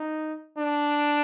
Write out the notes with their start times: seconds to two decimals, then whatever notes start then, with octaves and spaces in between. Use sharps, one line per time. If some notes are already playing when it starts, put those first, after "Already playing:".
Already playing: D#4
0.58 D4